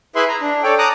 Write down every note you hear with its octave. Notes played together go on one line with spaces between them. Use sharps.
E4 G#4 B4 E5 B5 C6
A#5
D4
A4 C#5 D5 G5
A#5 D6 D#6 F#6